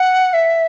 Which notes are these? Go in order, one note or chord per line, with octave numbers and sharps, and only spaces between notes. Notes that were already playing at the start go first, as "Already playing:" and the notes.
Already playing: F#5
E5